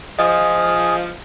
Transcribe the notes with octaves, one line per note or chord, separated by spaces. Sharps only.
F3 G#4 D#5